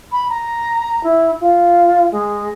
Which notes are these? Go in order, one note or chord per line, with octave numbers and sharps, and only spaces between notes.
B5
A#5
E4
F4
G#3